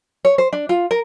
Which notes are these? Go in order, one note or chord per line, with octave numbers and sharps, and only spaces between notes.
C#5
C5
D4
F4
A#4